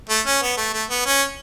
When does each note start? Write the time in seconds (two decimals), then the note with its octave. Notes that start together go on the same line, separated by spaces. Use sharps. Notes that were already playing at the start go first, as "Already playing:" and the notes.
0.09 A3
0.26 C#4
0.42 B3
0.57 A3
0.73 A3
0.90 B3
1.06 C#4